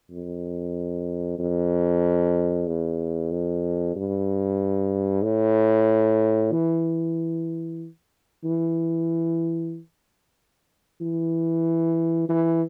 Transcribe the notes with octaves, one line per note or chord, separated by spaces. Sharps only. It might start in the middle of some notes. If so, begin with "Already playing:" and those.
F2
F2
E2
F2
G2
A2
E3
E3
E3
E3